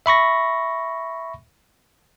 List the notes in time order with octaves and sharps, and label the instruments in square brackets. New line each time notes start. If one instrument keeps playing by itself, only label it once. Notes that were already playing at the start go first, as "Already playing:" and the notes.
[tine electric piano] E5 B5 C#6 A#6